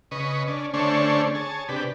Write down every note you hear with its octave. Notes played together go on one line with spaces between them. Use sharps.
C#3 B4 D#5 C#6
C#4 D4
D3 A3 C#4 D4 C5 C#5
G#4 C#5 A5
C3 D4 G4 B4